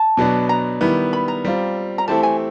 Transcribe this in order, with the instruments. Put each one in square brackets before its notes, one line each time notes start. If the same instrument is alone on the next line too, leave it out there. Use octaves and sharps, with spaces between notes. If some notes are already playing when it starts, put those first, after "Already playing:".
Already playing: [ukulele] A5
[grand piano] B2 F#3 B3 D4
[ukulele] A#5
[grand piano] D#3 G3 B3 E4
[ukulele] B5
A#5
[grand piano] G3 C4 F4
[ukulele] A#5
[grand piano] E3 A3 C4 E4 G4 [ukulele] A5
[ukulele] G#5